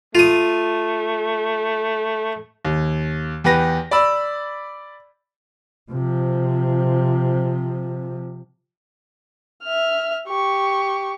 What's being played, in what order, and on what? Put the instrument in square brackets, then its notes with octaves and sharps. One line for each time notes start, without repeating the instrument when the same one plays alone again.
[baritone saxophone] A3 [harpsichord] F4 D#6
[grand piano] D#2
E2 G4 B4 A#6
D5 B5 E6
[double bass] C3 F3
[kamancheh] E5 F6
G4 C#6